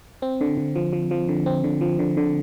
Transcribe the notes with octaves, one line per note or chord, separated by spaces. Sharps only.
C4
D3
D3
F3
F3
F3
D3
C4
D3
F3
D3
D3